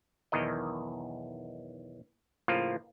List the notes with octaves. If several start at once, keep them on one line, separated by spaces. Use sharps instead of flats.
B1 E2 D#3 A#4 D#5
A2 C#3 F3 A#3 F4